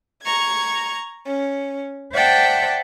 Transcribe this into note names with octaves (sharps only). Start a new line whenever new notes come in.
A#5 C#6 G#6
C#4
C5 D5 E5 F#5 G5 A5